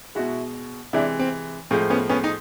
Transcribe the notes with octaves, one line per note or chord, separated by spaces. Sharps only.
B2 G#3 E4 F#4
C3 E3 G#3 D4 E4
C4
A2 F3 G#3 C4
B3 C#4
B3 C#4
D#4